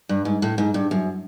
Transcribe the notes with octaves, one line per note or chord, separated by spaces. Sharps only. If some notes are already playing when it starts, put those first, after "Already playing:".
G2
G#2
A2
G#2
G2
F#2